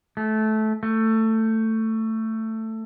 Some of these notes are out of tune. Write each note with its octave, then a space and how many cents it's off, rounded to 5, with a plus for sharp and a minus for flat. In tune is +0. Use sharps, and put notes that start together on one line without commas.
A3 -20
A3 +15